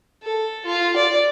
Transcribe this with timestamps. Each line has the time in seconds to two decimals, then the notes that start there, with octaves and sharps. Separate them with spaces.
0.23 A4
0.66 F4
0.97 D5